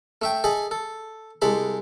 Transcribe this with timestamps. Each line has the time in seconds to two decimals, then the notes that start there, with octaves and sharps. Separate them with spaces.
0.22 A3 E5 G5
0.44 G#4 A4 D#5 G#5 B5
0.71 A4
1.42 C2 G#3 A4 B5